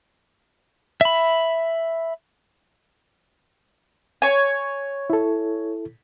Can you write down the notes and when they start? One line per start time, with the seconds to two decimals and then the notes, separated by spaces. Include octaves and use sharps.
1.01 E5 B5
4.22 C#5 G#5
5.10 E4 A4